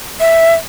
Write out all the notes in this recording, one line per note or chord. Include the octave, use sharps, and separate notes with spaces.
E5